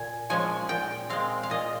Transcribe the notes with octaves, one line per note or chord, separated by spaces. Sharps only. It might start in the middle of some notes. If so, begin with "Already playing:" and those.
Already playing: A#2 G#5
F3 G#3 C#4 G#5
A#2 G5
G#3 C4 F5
F5
A#2 D#5